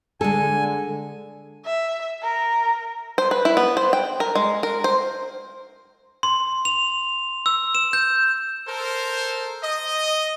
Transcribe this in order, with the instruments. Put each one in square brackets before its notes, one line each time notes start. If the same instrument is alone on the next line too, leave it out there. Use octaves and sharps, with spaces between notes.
[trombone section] D3 [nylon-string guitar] G#3 A4 [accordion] G#5
[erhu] E5
A#4
[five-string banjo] C5
B4
E4
B3
C5
G5
A#4
G#3
A#4
C5
[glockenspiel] C6
F7
E6
E7
G6
[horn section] A4 A#4 C5
D#5